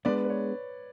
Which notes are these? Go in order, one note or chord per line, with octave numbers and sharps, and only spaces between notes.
G#3 B3 D4 B4 D5
B4
C#5